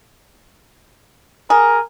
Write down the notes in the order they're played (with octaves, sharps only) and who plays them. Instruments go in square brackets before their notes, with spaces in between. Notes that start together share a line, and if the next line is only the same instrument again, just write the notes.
[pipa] G#4 [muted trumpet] A#4